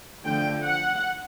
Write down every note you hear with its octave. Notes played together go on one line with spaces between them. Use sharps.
D3 F3 A3 G5
F#5